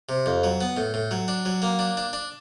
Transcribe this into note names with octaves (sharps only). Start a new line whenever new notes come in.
C3
F2
F#3
B3
A2
A2
F#3
D4
F#3
A#3
D4
D4
D4